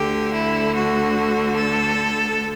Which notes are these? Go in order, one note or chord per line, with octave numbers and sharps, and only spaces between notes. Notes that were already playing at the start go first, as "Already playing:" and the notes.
Already playing: D2 D3 G4
E4
F#4
A4